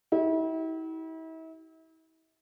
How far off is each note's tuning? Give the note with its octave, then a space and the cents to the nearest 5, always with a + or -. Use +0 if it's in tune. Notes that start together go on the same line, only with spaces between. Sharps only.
E4 -40 G4 -45